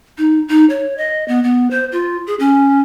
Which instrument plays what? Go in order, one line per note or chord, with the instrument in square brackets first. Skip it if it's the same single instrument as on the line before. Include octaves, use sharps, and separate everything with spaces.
[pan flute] D#4
D#4
C#5
D#5
B3
B3
C5
F4
G#4
C#4